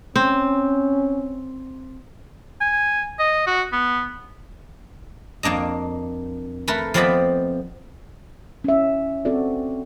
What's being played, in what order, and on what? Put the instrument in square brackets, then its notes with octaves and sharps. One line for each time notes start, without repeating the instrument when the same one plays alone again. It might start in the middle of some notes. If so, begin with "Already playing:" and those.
[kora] C4 [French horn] C#4
[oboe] G#5
D#5
F#4
B3
[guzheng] F2 A#3 D4 D#5
A3 A#4 B4
F3 B3 C4 D5 D#5 B5
[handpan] C#4 E5
C4 F#4 A4 D5